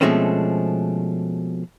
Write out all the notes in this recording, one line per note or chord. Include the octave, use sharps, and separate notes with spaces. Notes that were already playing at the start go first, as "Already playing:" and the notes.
B2 F3 G#3 A3 C4 C#4